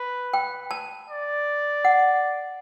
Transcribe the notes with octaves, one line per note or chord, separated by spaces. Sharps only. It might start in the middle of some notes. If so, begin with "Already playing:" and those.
Already playing: B4
G5
A5
D5
F#5